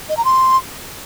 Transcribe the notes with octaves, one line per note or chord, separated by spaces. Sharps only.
D#5
A#5
C6